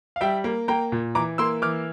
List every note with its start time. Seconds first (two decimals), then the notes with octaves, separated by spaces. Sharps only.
0.16 F5
0.21 G3 E5 G5
0.44 A#3
0.68 A#3 G5 A#5
0.92 A#2
1.15 E3 A#5 D6
1.38 A#3 C6 E6
1.62 E3 D6 F6